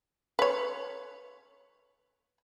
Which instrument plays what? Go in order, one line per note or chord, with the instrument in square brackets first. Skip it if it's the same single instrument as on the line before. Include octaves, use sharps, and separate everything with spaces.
[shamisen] B4 C#5